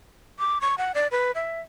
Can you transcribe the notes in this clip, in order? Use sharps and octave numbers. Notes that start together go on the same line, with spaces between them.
D6
C#6
F#5
D5
B4
E5